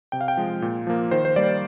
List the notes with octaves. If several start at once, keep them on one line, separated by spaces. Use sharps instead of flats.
C3 G5
F5
G5
F3 G#3
A#2
F3 A#3
D#3 C5
C5
G3 A#3 D5